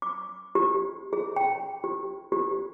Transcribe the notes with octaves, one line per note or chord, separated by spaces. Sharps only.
D6
G4
G#4
G5
G4
G4